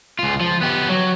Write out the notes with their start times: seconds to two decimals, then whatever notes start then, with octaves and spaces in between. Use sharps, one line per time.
0.19 C#2 F4
0.41 F3
0.61 B3 G4
0.89 F#3